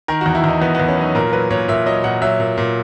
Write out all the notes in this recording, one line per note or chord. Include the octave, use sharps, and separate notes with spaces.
D#3 A#4
E2 F#4
E4
E2 D#4
E2 B3
E2 B3
C#4
F#3 D#4
A#2 A#4
F#3 B4
A#2 C#5
A#2 E5
F#3 D#5
A#2 F#5
F#3 E5
A#2
A#2